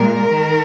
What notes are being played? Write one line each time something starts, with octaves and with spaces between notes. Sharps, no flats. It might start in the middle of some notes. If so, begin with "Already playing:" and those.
Already playing: A#2 G#3 A#4
D#3